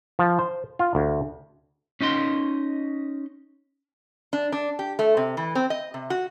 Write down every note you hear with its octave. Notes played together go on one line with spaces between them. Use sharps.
F3
C5
F4
D2
C#4 D#4 D#5 C6
D4
D4
G4
A3
C3
E3
C4
D#5
C3
F#4